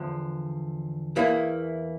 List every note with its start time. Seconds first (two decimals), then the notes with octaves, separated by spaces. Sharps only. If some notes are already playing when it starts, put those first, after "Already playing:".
Already playing: E2 D3 F3
1.16 E2 E3 A#3 E4